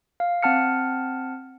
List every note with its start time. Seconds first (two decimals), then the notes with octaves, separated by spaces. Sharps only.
0.20 F5
0.43 C4 F#5 A5 F6 C#7